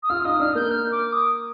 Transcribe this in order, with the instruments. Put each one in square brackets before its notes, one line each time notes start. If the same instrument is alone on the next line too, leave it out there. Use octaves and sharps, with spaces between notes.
[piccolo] D#6
[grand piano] F4 F5 [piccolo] F6
[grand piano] D#4 D#5 [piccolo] D#6
[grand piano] D4 D5 [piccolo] F6
[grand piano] A#3 A#4 [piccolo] G6
[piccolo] F6
D6
D#6